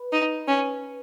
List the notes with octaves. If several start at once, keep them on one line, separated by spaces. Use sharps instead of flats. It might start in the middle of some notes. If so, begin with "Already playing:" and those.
Already playing: B4
D#4
C#4